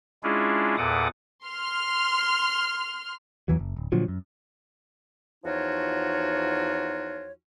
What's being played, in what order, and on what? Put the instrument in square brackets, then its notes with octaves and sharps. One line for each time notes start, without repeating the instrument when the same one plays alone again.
[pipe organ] G#3 C#4 D4 E4 F4 G#4
E2 A#2 A4 F#5 D6 D#6
[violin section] C6 F6
[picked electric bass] E2 E3 F#3
F#1
D1
A#2 D3 F3 F#3
F#2
[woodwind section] E2 F3 D#4 F4 F#4 C#5